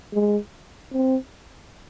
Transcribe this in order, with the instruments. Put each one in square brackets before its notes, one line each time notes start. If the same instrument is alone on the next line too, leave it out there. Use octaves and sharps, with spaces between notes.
[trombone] G#3
C4